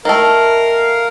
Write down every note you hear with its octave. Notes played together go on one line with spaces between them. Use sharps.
D#3 A3 A#4 F5